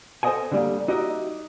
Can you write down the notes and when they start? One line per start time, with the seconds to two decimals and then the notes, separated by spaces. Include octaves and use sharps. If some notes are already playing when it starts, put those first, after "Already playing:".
0.23 A4 C5 C#5 D#5 F#5 G#5
0.52 D3 G3 A#3
0.88 D#4 F#4 G4 D#5 E5